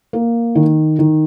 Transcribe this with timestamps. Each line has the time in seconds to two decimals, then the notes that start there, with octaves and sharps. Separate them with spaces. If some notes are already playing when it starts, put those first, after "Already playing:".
0.13 A#3
0.55 D#3
0.99 D#3